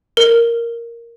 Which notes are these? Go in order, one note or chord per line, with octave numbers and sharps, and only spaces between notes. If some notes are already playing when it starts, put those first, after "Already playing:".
A#4